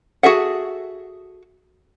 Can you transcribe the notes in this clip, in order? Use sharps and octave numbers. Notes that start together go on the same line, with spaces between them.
F#4 G#4 A4 E5 F#5